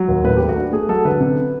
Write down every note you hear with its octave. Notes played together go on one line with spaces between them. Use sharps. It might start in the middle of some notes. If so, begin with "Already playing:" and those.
Already playing: F#3
D#2
A2 B4
A3 G4
F#4
D4
A3 G#4
F#3 A4
D3 B4
C3